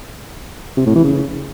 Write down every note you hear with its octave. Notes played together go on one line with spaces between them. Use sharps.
C3
A2
E3
C#3